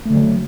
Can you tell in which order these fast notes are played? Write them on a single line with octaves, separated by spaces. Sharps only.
A3 D3 F#3